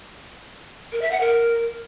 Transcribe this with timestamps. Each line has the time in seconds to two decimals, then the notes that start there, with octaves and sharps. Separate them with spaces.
0.92 A#4
1.02 E5
1.11 F#5
1.21 A#4